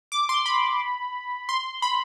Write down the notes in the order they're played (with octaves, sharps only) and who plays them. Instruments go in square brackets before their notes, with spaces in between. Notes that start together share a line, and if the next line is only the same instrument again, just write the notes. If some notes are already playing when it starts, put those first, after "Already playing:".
[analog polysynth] D6
C6
B5
C6
B5